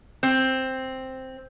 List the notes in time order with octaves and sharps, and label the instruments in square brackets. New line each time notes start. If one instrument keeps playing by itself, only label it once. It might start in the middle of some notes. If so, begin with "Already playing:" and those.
[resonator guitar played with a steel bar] C4